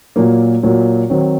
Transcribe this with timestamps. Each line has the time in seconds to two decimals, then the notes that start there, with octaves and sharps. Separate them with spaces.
0.16 A#2 F#3 A#3
0.63 A#2 F#3 A#3
1.10 D#3 F#3 C4 D#4